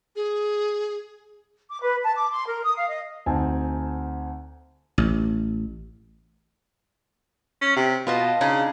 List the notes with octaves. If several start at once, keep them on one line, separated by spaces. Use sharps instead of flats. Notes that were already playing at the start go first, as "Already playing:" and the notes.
G#4
D6
B4
A5
D6
C6
A#4
D#6
F5
D#5
D2 C4 D#4 G#5 A5
A1
C#4
C3
B2 F4 D#5 A5
C#3 D4 D#4 G#4